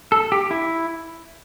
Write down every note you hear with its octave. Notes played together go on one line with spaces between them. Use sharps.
A4
G4
E4